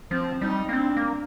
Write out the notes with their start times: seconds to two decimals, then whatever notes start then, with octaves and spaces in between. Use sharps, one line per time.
0.11 F3 C4
0.41 G3 D#4
0.69 A#3
0.73 C4 D4
0.97 A#3